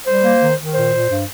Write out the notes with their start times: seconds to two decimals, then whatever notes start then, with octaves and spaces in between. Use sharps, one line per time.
0.06 G3 C5
0.23 A#3
0.40 D#3
0.58 D#3
0.74 A#2 C5
0.91 A#2
1.08 G2